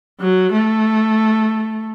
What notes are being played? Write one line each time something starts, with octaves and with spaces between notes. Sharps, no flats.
F#3
A3